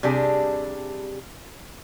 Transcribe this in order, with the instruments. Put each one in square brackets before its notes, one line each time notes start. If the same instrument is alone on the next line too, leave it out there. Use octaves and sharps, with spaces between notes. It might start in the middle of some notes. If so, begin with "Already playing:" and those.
[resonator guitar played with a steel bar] C3 G3 D4 G4 G#4